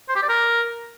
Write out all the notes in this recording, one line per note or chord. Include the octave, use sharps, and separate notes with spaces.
C5
G4
D5
A#4